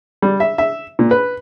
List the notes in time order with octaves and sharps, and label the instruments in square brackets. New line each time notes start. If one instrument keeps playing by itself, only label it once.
[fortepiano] G3
E5
E5
A#2
B4